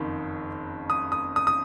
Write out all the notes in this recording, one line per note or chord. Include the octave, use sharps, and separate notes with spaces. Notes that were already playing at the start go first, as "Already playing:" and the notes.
Already playing: F#1 F2 D#3
D#6
D#6
D#6
D#6